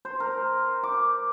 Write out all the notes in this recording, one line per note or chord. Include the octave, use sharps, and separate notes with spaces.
C5
A#4
D6